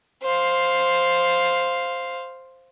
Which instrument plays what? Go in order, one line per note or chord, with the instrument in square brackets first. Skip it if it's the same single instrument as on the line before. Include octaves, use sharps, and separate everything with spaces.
[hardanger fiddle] C5 F5